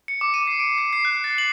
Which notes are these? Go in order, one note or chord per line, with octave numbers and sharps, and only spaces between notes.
C#7
D6
D#7
C7
D7
C7
C7
F#6
A6
F#7